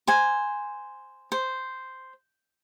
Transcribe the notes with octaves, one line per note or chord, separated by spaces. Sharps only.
C5 G#5
C5